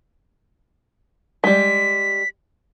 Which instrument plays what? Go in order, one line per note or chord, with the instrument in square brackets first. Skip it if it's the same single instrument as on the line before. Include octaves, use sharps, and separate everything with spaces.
[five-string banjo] G3 G#3 [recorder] B6